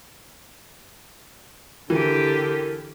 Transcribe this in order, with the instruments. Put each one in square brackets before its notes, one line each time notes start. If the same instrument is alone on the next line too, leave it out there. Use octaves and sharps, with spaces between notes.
[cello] D3 G4 [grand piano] E3 [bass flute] A#4